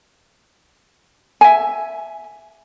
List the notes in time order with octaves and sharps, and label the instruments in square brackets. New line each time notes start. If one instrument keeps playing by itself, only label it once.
[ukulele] E5 G#5